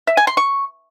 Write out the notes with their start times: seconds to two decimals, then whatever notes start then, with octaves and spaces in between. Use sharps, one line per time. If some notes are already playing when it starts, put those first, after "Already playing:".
0.07 E5
0.17 G#5
0.27 C6
0.37 C#6